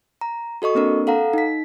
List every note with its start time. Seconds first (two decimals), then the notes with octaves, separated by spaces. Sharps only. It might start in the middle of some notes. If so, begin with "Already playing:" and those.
0.21 A#5
0.62 F#4 A4 D#5 C#6
0.75 A#3 C4 D4 A#4
1.07 A4 F5 F#5 A#5
1.33 D#4 B6